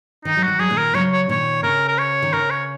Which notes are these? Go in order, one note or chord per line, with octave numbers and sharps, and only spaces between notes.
D#3 D#4
F#3
D#3 F#4
F#3 G#4
A#2 D#3
A#4
C#3 F#3 C#5
C#5
A#2 D#3 C#5
C#3 A#4
A#4
C#5
D#3
C#3 A#4
C#5